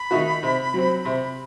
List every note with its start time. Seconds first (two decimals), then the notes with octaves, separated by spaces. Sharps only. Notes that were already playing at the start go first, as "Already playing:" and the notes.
Already playing: B5
0.11 D#3 A3 D#4 F#4
0.43 C3
0.74 F#3 C4
1.05 C3